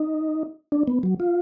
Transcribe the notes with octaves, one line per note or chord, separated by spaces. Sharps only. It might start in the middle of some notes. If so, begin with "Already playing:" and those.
Already playing: D#4
D4
B3
F#3
F4